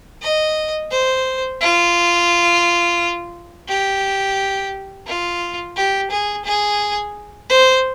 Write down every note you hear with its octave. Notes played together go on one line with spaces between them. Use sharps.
D#5
C5
F4
G4
F4
G4
G#4
G#4
C5